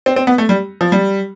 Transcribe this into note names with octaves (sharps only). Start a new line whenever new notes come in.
C4
C4
B3
A3
G3
F3
G3